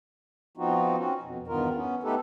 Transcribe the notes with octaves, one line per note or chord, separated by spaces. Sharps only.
F3 B3 C4 D#4 F4 F#4
C4 C#4 F#4
F2 B2
E2 G2 D#3 B3 F4 A#4
B3 C#4
A3 B3 D#4 G4 A4 B4